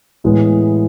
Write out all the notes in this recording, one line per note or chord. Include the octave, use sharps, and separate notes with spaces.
A2 E3 G#3 B3 E4